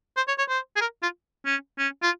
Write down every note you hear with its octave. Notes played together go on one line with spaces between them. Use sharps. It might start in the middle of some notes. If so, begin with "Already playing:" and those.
C5
C#5
C#5
C5
G#4
A#4
F4
C#4
C#4
F4